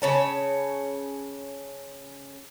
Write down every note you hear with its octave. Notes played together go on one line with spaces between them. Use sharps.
C#3 C#5 A5